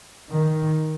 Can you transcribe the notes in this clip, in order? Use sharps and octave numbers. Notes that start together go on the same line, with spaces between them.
D#3